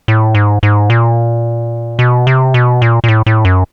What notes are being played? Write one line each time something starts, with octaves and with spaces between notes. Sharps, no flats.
A2
G#2
G#2
A#2
B2
C3
B2
A#2
A#2
A2
A2
F#2